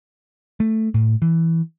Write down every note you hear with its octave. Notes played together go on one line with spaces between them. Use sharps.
A3
A2
E3